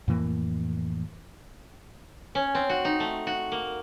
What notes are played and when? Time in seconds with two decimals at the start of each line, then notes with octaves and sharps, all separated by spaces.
0.08 F2 A2 E3 A#3
2.35 C#4
2.55 C4
2.69 F#4
2.85 D#4
3.00 A3
3.27 F#4
3.52 A#3